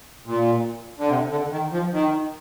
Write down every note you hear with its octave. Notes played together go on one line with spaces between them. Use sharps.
A#2
D3
C3
D3
D#3
F3
D#3